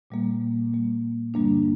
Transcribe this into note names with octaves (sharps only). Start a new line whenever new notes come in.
A#2 G3 A#3
A#2 G3 A#3
G2 D3 G3 A#3 D4